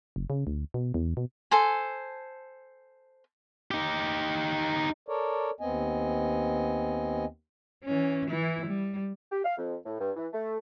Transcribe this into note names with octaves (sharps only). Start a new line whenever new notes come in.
F#1
C#3
D2
B2
E2
B2
A4 C5 G#5
D#4 G4
A4 A#4 C#5 D5
D#2 B3 C4 D#5 G#5
E3 C#4
E3 E4
G3
G4
F5
F2
A2
G2
E3
A3